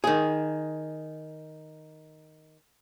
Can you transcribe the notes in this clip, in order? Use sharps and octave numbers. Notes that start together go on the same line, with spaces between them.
D#3 G#4